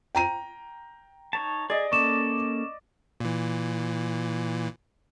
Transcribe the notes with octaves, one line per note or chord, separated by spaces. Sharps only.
G5 A#5 D#7
D#4 C#5 A5
G#4 D5 D#5
A#3 C#4 A4 C#6 D6 E7
A#2 E3